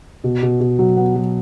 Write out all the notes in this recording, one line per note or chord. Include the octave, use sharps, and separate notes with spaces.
B2
B2
B2
F#3
B3
F#3